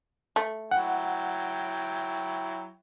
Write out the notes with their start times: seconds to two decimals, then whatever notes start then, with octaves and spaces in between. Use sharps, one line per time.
0.36 A3
0.71 F#3 E4 F#5 G5